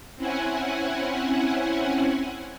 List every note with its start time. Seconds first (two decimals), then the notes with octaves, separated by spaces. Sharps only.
0.16 C4 C#4 E4 F#5 G#5